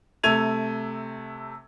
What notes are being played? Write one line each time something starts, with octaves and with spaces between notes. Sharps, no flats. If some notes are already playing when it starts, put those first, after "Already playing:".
C3 A3 G#6 D#7 F7